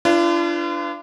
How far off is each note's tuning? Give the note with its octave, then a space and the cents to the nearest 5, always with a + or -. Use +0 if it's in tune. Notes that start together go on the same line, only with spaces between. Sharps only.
D4 +0 F4 -40 B4 +35